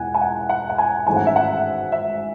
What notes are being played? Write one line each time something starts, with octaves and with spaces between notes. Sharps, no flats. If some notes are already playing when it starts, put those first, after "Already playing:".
Already playing: E1 E2 F#5 G#5
G#5
F#5
F#5
F#5
G#5
G#1 G#2 E3 A3 C#4 G#5
F#5
E5
F#5
E5